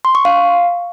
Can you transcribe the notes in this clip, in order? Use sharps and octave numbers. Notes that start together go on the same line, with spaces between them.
C6
C#6
F5